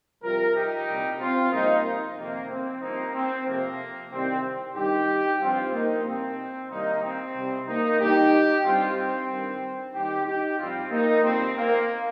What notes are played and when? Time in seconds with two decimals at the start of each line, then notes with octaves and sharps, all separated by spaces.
0.23 F2 C3 G3 F4 A#4
0.55 D#4 G4
0.88 C2 A#2 G3
1.20 C4 F4
1.52 F2 C3 G3 A#3 D#4
2.18 F2 C3 D#3 A#3
2.50 C4
2.82 C2 C3 F3 A#3 D#4
3.14 C4
3.46 F2 C3 F3 A#3
4.12 C2 C3 D#3 G3 C4
4.76 G2 D#3 G3 D#4 G4
5.41 G2 F3 C4 F4
5.73 A#3 D#4
6.05 C2 A#2 F3 C4
6.70 C2 C3 D#3 G3 A#3 D#4
7.03 C4
7.35 C2 C3 G3
7.67 A#3 D#4
8.00 D#2 D#3 G3 D#4 G4
8.65 G2 G3 C4 F4
8.97 C4
9.29 G2 D#3 G3
9.94 D#2 D#3 G3 D#4 G4
10.26 D#4 G4
10.59 F2 C3 G3 C4 F4
10.91 A#3 D#4
11.23 F2 D#3 G3 C4
11.57 A#3